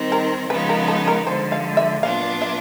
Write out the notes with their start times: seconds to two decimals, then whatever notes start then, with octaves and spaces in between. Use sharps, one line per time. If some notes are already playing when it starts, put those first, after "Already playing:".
Already playing: D#3 G3 C4
0.12 A#4
0.50 C#3 F3 G#3 B3 D#4 B4
0.69 A#4
0.88 A4
1.08 A#4
1.27 D3 F3 G#3 C5
1.52 F5
1.77 E5
2.03 A#2 F#3 B3 D4 F4 F5
2.42 E5